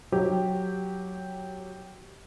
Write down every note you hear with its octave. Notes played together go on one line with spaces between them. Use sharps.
F#3 G4